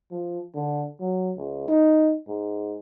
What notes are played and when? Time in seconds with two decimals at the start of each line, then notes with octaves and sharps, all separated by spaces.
0.11 F3
0.55 D3
1.00 F#3
1.37 C#2
1.68 D#4
2.27 G#2